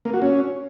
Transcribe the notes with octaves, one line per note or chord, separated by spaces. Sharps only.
A#3
F#4
C#4